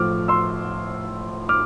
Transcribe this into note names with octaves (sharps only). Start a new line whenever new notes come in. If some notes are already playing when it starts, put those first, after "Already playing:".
Already playing: A2 F3 D6 F6
C6 E6
D6 F6